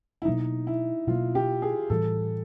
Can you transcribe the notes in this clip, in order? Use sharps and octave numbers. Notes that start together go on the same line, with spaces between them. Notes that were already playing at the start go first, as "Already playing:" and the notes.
E4
B2 F#3 A#3 D#4
E4
B2 F#3 A#3 F4
G4
G#4
A2 E3 G3 A4